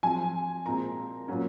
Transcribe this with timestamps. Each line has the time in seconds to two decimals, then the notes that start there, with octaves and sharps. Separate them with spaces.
0.03 F3 C4 G#5
0.66 A#2 G#3 C4 A#5
1.28 A#2 F#3 C#4